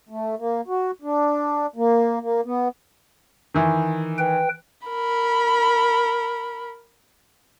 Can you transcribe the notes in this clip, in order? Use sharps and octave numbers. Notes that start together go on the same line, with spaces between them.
A3
A#3
F#4
D4
A#3
A#3
B3
D#3 E3
B4 G5
A#4 B5